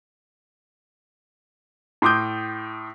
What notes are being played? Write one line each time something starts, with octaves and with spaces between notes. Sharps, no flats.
A2 C6 D6 D#6 G6